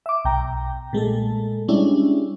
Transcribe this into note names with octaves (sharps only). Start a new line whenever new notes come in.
E5 D6
B1 G5 A#5
A#2 G#3 A3 A4
G3 G#3 C#4 D4 E4